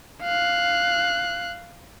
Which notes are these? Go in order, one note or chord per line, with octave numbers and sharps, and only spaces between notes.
F5 F#6